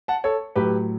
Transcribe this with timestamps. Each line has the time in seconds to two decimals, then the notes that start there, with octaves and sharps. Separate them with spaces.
0.08 F#5 A5
0.24 A4 C#5
0.55 A2 F#3 G4 B4